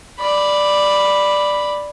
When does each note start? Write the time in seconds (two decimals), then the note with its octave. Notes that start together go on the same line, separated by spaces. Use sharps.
0.19 D5 B5